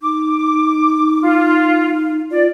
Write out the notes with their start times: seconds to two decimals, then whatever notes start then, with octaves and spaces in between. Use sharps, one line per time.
0.01 D#4 D6
1.21 F4
2.30 F4 D5